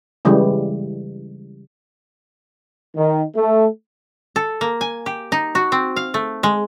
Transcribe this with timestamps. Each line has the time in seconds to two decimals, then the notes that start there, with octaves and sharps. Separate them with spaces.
0.25 C#3 E3 G3 G#3
2.96 D#3
3.35 A3
4.36 A4
4.61 A#3
4.81 G#5
5.06 G4
5.32 D#4
5.55 F#4
5.72 C4
5.96 F5
6.14 A3
6.43 G#3